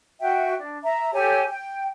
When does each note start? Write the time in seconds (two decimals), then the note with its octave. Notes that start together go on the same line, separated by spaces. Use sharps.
0.20 F#4 E5 G5
0.59 D4
0.84 E5 A#5
1.13 G4 A4 C#5 G#5
1.49 G5